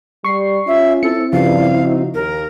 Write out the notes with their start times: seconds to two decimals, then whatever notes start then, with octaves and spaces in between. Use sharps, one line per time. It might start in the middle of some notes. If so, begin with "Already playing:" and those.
0.25 G3 C#6 C7
0.67 C#4 F4 E5
1.03 C4 E4 A4 C#7
1.33 G2 C#3 F3 F5
1.81 D#4 F#4
2.14 D#2 A#4